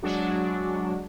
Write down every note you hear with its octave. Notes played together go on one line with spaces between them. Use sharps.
F#3 G#3 D4 F#4